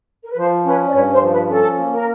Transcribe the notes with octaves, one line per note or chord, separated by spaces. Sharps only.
A#4
B4
F3 C5
C#4 B4 C#5
D5
G2 B4 C#5
C5
F3
B4
C#4 A4
A#3
A#4